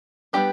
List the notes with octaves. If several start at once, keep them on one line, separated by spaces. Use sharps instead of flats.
G3 B3 D4 G4